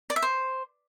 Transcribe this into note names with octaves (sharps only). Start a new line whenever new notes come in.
D5
E5
C5